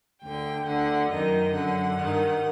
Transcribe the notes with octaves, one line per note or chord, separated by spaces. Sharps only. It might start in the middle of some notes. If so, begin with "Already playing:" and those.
D2 D3 G5
D2 D3 F#5
F#2 D#3 D#5
F#2 D3 F#5
G2 D#3